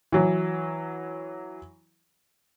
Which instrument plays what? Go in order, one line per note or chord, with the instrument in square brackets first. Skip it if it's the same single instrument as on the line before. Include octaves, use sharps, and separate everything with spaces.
[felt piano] E3 F#3